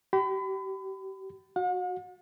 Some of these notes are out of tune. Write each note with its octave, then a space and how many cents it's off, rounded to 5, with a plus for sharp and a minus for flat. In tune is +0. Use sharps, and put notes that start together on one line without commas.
G4 -35 B5 +35
F#4 -10 F#5 -45